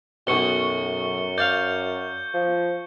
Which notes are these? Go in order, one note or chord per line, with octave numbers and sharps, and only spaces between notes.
B1 F#2 B2 C#6 C#7 G7
D5 F5 G6
F3